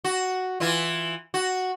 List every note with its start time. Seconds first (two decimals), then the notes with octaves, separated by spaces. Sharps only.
0.04 F#4
0.60 E3 E4 F4
1.34 F#4